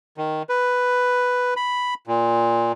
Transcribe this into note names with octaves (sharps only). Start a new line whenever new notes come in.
D#3
B4
B5
A#2